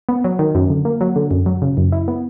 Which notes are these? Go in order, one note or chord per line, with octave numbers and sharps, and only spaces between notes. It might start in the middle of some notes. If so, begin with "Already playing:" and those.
B3
F#3
D#3
F#2
D3
A#3
F#3
D3
F#2
F#3
C#3
F#2
E4
B3